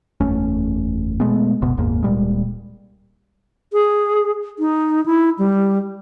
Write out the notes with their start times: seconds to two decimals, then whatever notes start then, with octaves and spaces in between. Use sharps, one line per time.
0.21 F#1 E2 A3 C#4
1.20 B2 G#3 A3 B3
1.61 F#1 D2 B2 B3
1.77 F#1 D#2 G#2 A#3
2.03 D1 A#2 G3 G#3
3.73 G#4
4.59 D#4
5.06 E4
5.39 G3